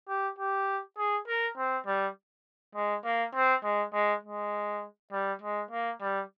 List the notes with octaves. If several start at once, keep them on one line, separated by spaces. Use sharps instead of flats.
G4
G4
G#4
A#4
C4
G3
G#3
A#3
C4
G#3
G#3
G#3
G3
G#3
A#3
G3